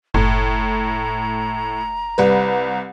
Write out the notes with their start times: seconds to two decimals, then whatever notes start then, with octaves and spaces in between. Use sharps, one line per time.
0.14 F#1 A2 A#5
2.18 C2 G3 B4